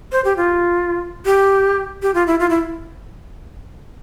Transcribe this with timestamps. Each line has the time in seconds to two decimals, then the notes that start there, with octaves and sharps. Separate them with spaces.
0.12 C5
0.25 G4
0.37 F4
1.26 G4
2.02 G4
2.14 F4
2.27 E4
2.40 F4
2.50 E4